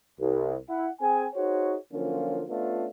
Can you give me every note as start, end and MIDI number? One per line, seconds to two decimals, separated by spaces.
0.20 0.55 36
0.69 0.89 64
0.69 0.89 78
1.01 1.25 60
1.01 1.25 68
1.01 1.25 79
1.01 1.25 80
1.35 1.76 63
1.35 1.76 66
1.35 1.76 68
1.35 1.76 72
1.35 1.76 73
1.93 2.44 50
1.93 2.44 53
1.93 2.44 54
1.93 2.44 58
1.93 2.44 61
1.93 2.44 65
2.49 2.86 57
2.49 2.86 59
2.49 2.86 61
2.49 2.86 62
2.49 2.86 65